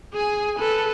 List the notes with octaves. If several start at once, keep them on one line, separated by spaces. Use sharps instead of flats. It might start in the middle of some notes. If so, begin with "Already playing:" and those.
G#4 G#5
A4 B4